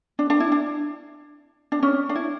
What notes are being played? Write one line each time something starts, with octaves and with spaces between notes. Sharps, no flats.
D4
D4
E4
D4
D4
C#4
D4
E4